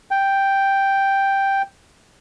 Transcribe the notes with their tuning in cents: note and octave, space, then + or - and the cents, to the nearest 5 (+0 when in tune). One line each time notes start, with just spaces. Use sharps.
G5 +0